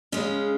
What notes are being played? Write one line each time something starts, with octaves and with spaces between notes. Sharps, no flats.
C#3 G#3 C#4